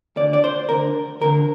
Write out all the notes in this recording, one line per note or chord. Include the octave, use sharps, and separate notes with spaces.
D2 D3 D5
D5
C5
D2 D3 A#4
D2 D3 A#4